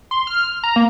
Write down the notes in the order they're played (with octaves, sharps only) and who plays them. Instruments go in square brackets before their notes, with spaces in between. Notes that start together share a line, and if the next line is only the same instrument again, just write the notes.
[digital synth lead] C6
F6
A#5
A#3